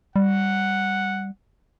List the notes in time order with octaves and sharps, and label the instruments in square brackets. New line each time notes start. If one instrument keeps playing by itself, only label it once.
[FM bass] G3 [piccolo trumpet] F#5